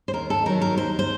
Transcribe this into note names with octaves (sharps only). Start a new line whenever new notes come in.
C5
D#2 A#4
A4
D#3 F#3 A#4
A#4
D#2 C5
C5